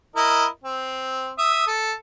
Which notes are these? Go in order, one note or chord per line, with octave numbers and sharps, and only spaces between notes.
E4 A#4 D#5
C4
E5 D#6
A4